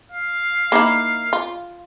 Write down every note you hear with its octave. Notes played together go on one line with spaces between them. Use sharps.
F5
A#3 D#4 E4
F4